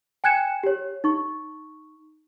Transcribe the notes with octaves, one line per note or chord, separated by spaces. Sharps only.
G5 G#5 F#6 G#6 C#7 E7
G4 C#5
D#4 C#6